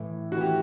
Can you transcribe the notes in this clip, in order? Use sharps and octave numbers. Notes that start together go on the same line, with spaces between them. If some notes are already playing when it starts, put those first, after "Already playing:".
Already playing: A2 E3
A2 F#4
E3 G4